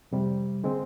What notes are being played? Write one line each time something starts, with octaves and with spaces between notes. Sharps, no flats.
F2 C3 G3
D3 G#3 C4